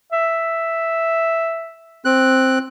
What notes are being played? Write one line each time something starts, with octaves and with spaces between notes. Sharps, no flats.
E5
C4 F#6